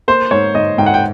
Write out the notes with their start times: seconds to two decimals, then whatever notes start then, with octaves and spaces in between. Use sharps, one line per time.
0.08 A#3 C5
0.31 G#2 C#5
0.55 G#2 D#5
0.78 G#2 G5
0.86 F#5
0.94 G5